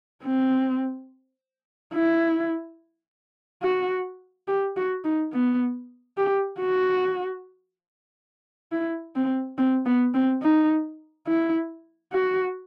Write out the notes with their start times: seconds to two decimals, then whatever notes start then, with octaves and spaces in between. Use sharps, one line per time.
0.24 C4
1.94 E4
3.63 F#4
4.48 G4
4.77 F#4
5.04 D#4
5.32 B3
6.17 G4
6.60 F#4
8.72 E4
9.16 C4
9.58 C4
9.85 B3
10.14 C4
10.43 D#4
11.27 E4
12.13 F#4